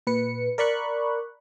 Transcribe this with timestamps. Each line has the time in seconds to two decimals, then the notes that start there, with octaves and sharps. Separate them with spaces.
0.07 A#2 B4 C#7
0.58 A#4 D5 B5 C#6 F#6